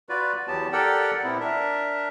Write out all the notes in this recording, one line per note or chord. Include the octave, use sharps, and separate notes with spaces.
F4 F#4 B4 D5
E2 F#3 B3 G4 A5
G4 A4 A#4 D5 F#5 G5
A#2 B3 C4 E4
D4 A#4 E5